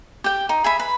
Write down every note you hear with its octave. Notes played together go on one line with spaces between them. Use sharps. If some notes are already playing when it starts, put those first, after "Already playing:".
G4 G5
D#4
G#4 E5 B5
B4